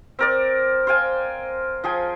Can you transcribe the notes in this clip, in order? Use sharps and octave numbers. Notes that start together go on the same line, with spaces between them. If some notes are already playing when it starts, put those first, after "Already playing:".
C4 A#4 D5
C5 F5 G5 G#5
F3 G#4 G5 G#5